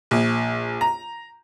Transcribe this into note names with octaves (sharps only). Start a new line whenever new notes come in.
A#1
A#5